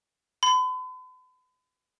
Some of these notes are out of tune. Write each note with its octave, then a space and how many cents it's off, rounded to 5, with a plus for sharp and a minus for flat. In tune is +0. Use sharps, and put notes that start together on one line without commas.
B5 +45